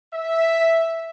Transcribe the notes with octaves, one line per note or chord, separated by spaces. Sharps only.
E5